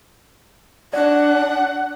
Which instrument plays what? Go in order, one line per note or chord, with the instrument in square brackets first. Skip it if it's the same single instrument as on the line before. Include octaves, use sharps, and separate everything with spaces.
[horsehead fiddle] D4 [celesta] D5 [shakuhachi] F#5